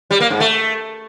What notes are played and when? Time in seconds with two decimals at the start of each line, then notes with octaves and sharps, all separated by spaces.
0.11 G3
0.20 A#3
0.30 G#2
0.40 A3